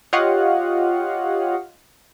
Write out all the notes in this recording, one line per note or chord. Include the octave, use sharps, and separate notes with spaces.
F4 G4 C#5 D#5 F5 F#5